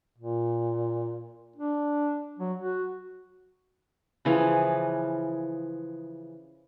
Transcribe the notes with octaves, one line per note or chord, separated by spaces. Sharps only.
A#2
D4
F#3
F#4
C#3 E3 F3 G#4